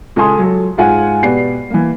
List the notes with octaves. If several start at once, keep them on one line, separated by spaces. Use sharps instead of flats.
C#2 A4 G#5 C6 D#6
F#3 A4
G#2 F4 F#5 G#5
B2 G4 B4 D5 C7
E3 A#3